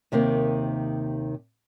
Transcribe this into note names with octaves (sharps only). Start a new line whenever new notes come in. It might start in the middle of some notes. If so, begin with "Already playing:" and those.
D#2 C3 D#3 A#3